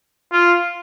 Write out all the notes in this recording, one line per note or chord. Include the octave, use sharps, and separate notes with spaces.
F4